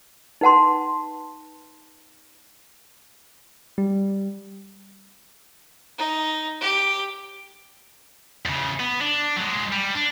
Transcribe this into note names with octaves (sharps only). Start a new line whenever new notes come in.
D#4 B4 F#5 A5 C6
G3
D#4
G4
E2 C#3
B3
D4
F#3 G#3
G3
D4